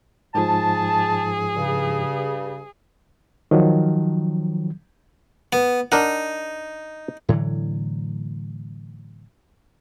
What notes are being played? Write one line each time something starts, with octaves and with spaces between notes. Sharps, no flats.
G#2 F3 G#4 A5
G2 C#3
D#3 F3 F#3
B3
D4 D#4 A#4 F#5
A2 D3 E3 F#3